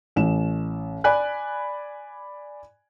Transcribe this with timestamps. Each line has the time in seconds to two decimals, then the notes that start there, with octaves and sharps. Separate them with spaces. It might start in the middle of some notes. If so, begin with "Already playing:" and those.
0.16 A1 E7
1.04 D5 G#5 B5 F#6